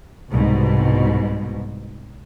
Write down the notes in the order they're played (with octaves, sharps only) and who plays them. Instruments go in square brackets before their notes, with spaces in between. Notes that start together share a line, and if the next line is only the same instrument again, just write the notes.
[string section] C2 G#2 B2